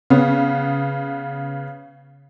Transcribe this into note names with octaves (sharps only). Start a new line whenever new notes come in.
C#3 B3